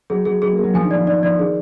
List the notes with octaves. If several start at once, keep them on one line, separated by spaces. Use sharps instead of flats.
F#3 G#4
F#3 G#4
F#3 G#4
A#3
G#4
F#3
F3 G#5
D#3
D5
F3
D#3 D5
F3 D5
D#3 G#4